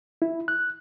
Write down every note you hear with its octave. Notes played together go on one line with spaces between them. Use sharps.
E4
F#6